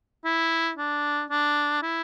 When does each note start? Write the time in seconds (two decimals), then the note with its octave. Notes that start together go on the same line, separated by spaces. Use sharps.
0.25 E4
0.77 D4
1.30 D4
1.82 E4